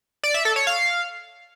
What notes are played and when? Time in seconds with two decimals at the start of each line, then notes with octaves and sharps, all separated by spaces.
0.24 D5
0.34 E5
0.45 A4
0.56 C#5
0.67 F5